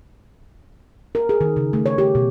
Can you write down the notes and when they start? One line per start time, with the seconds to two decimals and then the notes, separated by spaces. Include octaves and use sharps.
1.15 A#4
1.29 G#4
1.41 D#3
1.57 C#3
1.73 A3
1.86 C#5
1.98 G4
2.15 B2